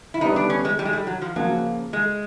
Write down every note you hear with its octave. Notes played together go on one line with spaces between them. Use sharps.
E4
D3 G3 B3 D#4
D4
C#4
G#3
G3
G#3
G3
F#3
F3
C#3 F3 F#3 A#3
G#3